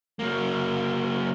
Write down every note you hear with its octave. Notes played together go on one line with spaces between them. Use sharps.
F#3 A#3